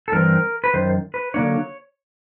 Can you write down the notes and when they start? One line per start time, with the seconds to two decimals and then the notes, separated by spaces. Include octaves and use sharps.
0.08 A4
0.12 G2 E3 C4 A#4
0.64 B4
0.74 F#2 D#3 C5
1.14 B4
1.34 D3 F#3 A#3 D4 C#5